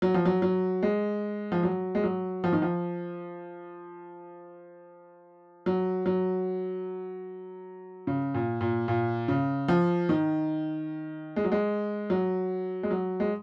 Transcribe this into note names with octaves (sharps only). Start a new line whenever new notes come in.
F#3
F3
F#3
F#3
G#3
F3
F#3
G#3
F#3
F3
D#3
F3
F#3
F#3
C#3
A#2
A#2
A#2
C#3
F3
D#3
G#3
F#3
G#3
F#3
G#3
F#3
G#3